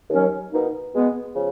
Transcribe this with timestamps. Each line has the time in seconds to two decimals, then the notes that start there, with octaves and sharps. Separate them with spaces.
0.10 D#2 D#3 F#3 C#4
0.52 B2 A#3 D#4
0.94 B2 G#3 B3
1.35 C#3 F3